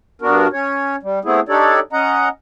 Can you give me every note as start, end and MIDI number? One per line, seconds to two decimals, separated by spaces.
0.22 0.47 43
0.22 0.47 59
0.22 0.47 62
0.22 0.47 66
0.22 0.47 70
0.53 0.96 61
0.53 0.96 73
1.03 1.19 55
1.25 1.40 57
1.25 1.40 59
1.25 1.40 60
1.25 1.40 64
1.25 1.40 68
1.49 1.80 62
1.49 1.80 63
1.49 1.80 67
1.49 1.80 69
1.49 1.80 73
1.49 1.80 74
1.93 2.29 61
1.93 2.29 75
1.93 2.29 78
1.93 2.29 82